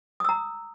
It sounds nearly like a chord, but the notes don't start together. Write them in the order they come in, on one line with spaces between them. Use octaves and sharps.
D#6 E6 A#5